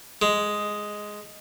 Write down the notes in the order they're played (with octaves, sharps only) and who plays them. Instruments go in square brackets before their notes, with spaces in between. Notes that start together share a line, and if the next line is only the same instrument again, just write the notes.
[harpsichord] G#3